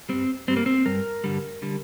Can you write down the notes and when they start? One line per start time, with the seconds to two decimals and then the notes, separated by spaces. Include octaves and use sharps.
0.09 G2 G3 C4
0.48 G2 G3 C4
0.57 A#3
0.66 C4
0.86 G2 G3 A#4
1.24 G2 D3 G3
1.62 D3 G3